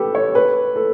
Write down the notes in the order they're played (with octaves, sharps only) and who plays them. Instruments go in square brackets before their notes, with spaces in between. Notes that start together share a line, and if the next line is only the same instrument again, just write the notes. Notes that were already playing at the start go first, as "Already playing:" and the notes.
Already playing: [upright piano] G4 A4 B4
C#5
B4
A4